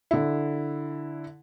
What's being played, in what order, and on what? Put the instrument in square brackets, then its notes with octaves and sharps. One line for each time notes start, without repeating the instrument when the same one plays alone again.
[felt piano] D3 E4